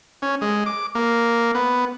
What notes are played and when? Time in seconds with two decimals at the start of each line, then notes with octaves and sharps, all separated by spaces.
0.22 C#4
0.41 G#3
0.66 D6
0.95 A#3
1.55 B3